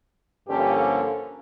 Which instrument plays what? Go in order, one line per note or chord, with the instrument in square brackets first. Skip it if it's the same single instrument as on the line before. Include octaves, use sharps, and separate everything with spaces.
[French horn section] G2 D3 F3 A#3 C#4 G4 A4